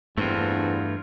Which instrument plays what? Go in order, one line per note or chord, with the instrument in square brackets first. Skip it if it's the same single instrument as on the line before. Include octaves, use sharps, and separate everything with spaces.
[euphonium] E2 [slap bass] G2 [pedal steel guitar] A3 F4 [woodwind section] C4 D4 F#4